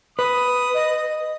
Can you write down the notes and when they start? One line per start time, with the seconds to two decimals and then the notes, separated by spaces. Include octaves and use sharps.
0.19 B4 D#6
0.74 D#5